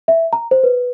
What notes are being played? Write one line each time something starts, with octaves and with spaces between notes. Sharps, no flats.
E5
A#5
C5
B4